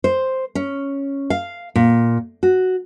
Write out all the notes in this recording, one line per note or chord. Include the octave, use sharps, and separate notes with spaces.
C5
C#4
F5
A#2
F#4